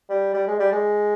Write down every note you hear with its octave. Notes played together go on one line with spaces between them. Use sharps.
G3
G3
G#3
G3
G#3